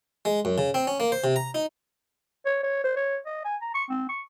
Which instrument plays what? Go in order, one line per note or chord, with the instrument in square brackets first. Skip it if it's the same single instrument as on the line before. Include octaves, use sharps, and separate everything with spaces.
[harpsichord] G#3
F#2
C#3
C4
C#4
A#3
C5
C3
A#5
D#4
[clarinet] C#5
C#5
C5
C#5
D#5
G#5
A#5
C#6
C4
C#6